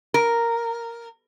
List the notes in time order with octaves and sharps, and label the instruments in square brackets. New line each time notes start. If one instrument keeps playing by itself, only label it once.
[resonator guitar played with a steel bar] A#4